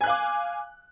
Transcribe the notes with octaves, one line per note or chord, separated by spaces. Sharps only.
F5 G#5 D6 F#6